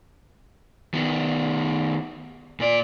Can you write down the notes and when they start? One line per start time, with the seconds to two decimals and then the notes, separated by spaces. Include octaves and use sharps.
0.94 D#3 B3
2.60 A#2 D5